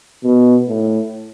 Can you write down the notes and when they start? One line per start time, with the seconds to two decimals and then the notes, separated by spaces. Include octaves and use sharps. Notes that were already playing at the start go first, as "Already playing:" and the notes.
0.24 B2
0.67 A2